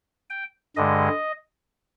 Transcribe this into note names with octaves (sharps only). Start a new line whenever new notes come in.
G5
G2 D3 G#3 D#5